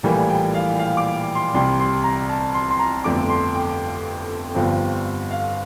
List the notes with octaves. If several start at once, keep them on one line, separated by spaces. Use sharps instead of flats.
A#1 A2 E3 G3 A#3
G5
F5
F5
D6
C6
C2 C3 G3 C6
C6
A#5
A5
C6
C6
A#5
G1 F2 D3 A3 D6
C6
G5
G1 G2 F3 C4
F5